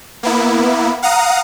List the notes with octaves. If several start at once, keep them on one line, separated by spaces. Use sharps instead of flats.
A#3 B3 E4
F5 F#5 A#5 D#6